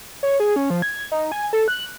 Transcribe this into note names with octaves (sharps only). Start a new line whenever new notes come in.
C#5
G#4
C#4
F3
G#6
D#4
G#5
A4
F#6